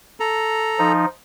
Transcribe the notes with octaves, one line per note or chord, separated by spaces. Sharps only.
A4 A#5
F3 D#4